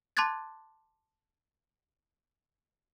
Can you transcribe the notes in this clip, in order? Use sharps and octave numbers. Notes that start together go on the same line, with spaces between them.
A5 C6 D6 F#6 G#6 A6